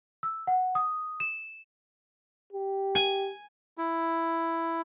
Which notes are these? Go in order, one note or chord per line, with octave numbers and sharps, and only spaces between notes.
E6
F#5
D#6
E7
G4
G#5
E4